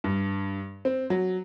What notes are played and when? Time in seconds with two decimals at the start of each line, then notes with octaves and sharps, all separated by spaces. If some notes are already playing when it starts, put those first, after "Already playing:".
0.04 G2
0.85 C4
1.10 F#3